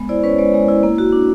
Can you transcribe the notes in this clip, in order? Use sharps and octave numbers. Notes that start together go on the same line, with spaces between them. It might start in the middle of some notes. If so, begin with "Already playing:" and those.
Already playing: G#3 B3
E4 C5 D5
C#4 B4 C#5
G#3 C5 D5
G#3
E4
A#3
F#4
D4